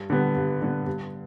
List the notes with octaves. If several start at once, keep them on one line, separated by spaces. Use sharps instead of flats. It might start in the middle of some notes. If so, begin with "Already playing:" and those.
Already playing: G2
D3 G3 B3
G2
D3 G3 B3
G2